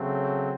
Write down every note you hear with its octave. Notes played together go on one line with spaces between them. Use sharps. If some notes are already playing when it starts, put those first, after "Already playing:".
Already playing: C#3 F#3 A3 C4